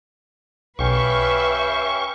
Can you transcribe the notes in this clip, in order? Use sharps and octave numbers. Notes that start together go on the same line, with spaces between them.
B1 C#4 G4 B4 E5 F5 C#6